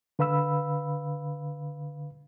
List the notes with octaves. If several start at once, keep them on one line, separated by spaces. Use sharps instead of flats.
D3 B4 F5 B5 E6